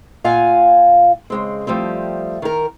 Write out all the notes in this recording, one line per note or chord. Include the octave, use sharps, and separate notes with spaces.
A#2 F4 F5 F#5 G#5
C#3 G#3 C4
F3 G3 A3 C4
D#3 A#4